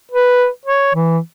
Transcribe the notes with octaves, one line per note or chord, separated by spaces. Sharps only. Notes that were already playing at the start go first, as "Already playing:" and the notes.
B4
C#5
E3